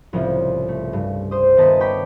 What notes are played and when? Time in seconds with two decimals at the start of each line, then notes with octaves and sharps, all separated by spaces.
0.13 C2 A2 C#3 F3
0.68 A3
0.93 G2
1.31 C5 D#6
1.57 D#1 B3 D#5 A5 A#5 B6
1.80 C#5 G5 B5 D6